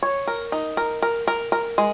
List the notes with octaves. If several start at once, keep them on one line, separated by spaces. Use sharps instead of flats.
C#5
A#4
D#4
A#4
A#4
A#4
A#4
G#3